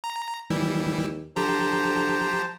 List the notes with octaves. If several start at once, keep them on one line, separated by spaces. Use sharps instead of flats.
A#5
D#2 E3 G3 E4
D3 F3 G4 C5 A5 A#5